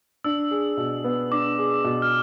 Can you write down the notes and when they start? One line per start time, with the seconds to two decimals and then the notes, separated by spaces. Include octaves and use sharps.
0.24 D4 E6
0.51 G#4
0.77 B2
1.04 B3
1.31 D4 D6
1.58 G#4
1.84 B2
2.02 F6